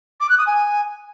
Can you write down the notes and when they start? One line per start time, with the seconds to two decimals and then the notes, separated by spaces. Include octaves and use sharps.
0.20 D6
0.29 F#6
0.38 D#6
0.47 G#5